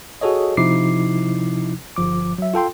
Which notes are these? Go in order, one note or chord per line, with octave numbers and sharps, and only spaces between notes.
F#4 G#4 A4 C#5 D#5
C3 F3 D#4 E4 D6 C7
G1 F3 D6
F#3 E5
F4 A4 G5 C6